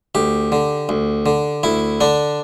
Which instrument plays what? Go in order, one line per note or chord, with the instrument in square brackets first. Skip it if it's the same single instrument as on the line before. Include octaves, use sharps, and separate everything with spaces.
[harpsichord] D2 G4
D3
D2
D3
D2 E4
D3 D4